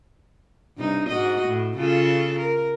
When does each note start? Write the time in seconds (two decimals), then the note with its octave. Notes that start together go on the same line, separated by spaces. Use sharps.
0.77 G2 C3 D#4
1.09 G#2 F#4 D#5
1.47 A2
1.77 C#3 F4 A4
2.39 A#4